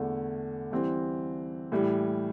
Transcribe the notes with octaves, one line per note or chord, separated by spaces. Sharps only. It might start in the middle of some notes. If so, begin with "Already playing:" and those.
Already playing: E2 D3 A3
E3 G3 C4
A2 E3 G3